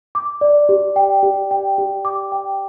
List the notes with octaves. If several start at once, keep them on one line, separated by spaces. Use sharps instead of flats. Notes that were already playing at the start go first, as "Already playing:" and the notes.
D6
D5
G4
G5
G4
G5
G4
D6
G5